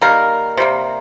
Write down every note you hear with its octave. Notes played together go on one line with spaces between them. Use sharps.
D#3 G3 A#3 A#4
C3 G3 A#3